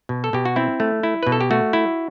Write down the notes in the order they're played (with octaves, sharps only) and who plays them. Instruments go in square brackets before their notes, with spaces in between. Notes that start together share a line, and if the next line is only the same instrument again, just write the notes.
[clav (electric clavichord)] B2
A4
B2 G4
F#4
C4 E4
A3
E4
B2 B4
A4
G4
A3 F#4
E4